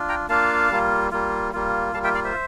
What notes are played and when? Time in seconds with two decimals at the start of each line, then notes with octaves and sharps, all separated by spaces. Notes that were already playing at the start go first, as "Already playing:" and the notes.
Already playing: D4 F4
0.09 G5 A#5
0.29 A#3 D4 F4 F5 A5
0.70 G3 A#3 F4
1.11 G3 A#3 F4
1.53 G3 A#3 F4
1.94 G3 A#3 F4 F5 A5
2.04 E5 G5
2.15 D5 F5
2.24 C5 E5